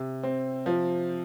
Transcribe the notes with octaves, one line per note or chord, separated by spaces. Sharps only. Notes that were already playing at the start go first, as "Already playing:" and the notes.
Already playing: C3
C4
F3